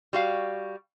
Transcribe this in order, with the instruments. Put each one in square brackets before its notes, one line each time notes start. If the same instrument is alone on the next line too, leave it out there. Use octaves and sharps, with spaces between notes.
[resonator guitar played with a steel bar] G3 F#4 F5